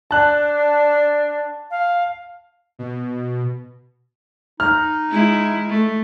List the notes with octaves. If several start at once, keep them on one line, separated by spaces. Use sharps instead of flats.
D4 A5 F#6
F5
B2
D#4 F6
G#3 E4
A3